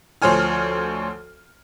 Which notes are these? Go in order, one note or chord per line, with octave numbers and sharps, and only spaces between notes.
D2 F3 C5 C#5 G#5 F6